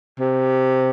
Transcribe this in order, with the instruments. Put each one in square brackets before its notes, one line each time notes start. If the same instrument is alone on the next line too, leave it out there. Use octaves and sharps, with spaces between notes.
[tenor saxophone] C3